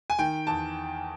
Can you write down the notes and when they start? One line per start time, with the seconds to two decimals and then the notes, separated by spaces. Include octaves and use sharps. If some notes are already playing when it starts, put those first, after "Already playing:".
0.10 G#5
0.19 D#3 G5
0.47 E2 A5